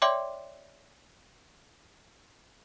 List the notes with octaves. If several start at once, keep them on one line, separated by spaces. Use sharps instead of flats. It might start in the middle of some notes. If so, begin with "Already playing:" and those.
C#5 D5 E5 G5 C6 D6